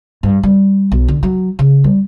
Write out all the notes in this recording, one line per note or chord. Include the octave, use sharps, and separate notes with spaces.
G2
G3
B1
D3
F#3
C#3
G3